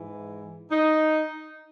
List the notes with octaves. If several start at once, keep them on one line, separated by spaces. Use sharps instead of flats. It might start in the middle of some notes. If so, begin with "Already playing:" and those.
Already playing: G#2 E3
D#4